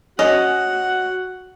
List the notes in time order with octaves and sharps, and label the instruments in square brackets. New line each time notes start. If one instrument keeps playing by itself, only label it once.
[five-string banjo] C#4 D#5 [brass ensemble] F#4 [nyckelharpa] F#5